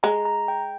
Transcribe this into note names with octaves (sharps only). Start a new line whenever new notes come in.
G#3 A#5
A#5
G5